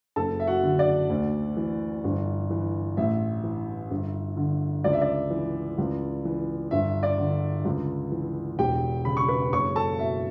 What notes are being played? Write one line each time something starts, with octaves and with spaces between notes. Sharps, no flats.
F#1 A4 A5
E5
F#4 F#5
D3
D5
D2
E3
G1
E3
A1 E5
E3
G1
D3
C#2 D5
E5
D5
E3
C#2
E3
G1 E5
D5
D3
C#2
E3
E1 G4 G5
C#3 B5
C#6
B4 B5
F#1 C#5 C#6
A4 A5
B2 E5